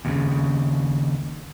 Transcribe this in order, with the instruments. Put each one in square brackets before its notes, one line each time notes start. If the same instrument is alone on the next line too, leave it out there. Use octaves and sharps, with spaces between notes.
[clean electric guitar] D#2 A#2 C#3